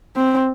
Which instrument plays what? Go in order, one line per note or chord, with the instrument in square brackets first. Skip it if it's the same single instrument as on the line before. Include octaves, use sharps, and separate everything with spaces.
[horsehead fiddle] C4